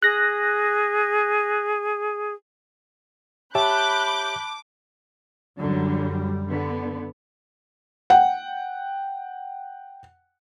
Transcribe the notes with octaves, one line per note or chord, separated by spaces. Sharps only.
G#4 F#6 A#6
G4 C#5 E5 A5 B5 D6 F#6 G6
F#2 D3 F#3 G3
D3 B3
F#5 G5